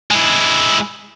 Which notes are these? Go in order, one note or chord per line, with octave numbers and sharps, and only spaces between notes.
G#3 E4